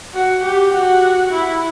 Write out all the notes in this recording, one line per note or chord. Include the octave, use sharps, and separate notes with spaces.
F#4
G4
F#4
E4